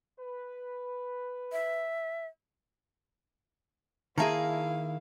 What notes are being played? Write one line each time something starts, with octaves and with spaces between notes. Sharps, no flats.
B4
E5
D#3 A#3 E4 G#4 E5 F5 A5 A#5